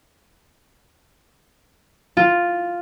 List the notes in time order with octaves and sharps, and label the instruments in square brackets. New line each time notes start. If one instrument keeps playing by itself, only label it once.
[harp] F4